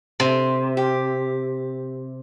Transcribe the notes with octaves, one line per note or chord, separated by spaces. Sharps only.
C3
G4